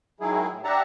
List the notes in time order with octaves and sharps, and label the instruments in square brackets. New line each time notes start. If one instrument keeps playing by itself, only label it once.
[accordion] D#3 F#3 G#3 E4 G#4
A2
D4 G4 E5 F#5 A5 A#5